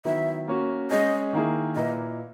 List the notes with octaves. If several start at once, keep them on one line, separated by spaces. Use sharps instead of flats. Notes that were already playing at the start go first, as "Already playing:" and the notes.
D#3 F#3 B3 E4 E5
A#3 C#4 F#4
G#3 C#4 G#4 D#5
D#3 A#3 E4 G#4
A#2 A#3 E4 B4 D#5